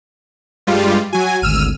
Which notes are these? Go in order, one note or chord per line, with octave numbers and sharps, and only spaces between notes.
G2 G3 G#3 F4
F#3 F#4 G#5
G#1 D2 E6 F6 D#7